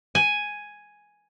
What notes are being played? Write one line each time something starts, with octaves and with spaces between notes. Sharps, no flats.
G#5